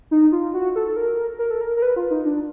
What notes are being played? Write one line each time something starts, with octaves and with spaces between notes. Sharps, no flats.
D#4
F4
F#4
A4
A4
A#4
A#4
A4
A#4
A#4
B4
F4
D#4
D4